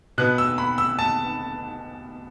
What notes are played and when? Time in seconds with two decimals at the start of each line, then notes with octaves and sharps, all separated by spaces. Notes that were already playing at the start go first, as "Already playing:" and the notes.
0.18 B2 B3 F#6
0.38 E6
0.58 B5
0.78 E6
0.99 A5